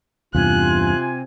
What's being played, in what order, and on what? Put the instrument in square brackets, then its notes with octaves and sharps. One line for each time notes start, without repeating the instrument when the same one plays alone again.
[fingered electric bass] E2 G2 [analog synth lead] C3 [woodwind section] F4 G#5 [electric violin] F#6